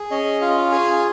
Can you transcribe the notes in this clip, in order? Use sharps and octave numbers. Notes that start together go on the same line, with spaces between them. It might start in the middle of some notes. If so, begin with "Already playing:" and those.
Already playing: G#4
C#4 D#5
F4 F5
D#5
F5
G#4 G#5